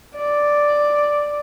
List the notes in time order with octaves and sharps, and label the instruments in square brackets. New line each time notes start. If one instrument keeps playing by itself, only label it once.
[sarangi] D5